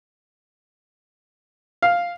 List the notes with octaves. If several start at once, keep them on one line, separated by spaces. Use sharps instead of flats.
F5